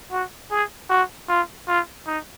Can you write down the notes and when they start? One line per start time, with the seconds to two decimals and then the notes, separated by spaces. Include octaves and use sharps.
0.11 F#4
0.51 G#4
0.90 F#4
1.29 F4
1.68 F4
2.07 D#4